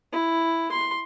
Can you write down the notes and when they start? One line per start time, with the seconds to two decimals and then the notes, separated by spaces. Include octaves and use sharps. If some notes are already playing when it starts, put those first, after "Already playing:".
0.13 E4
0.72 C6